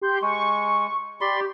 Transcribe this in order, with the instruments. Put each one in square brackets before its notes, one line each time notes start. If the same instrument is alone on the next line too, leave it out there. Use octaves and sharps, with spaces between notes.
[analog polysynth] G4 C6 G6
[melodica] G#3 [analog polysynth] C#6
[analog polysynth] G4 [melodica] D5 B5 C6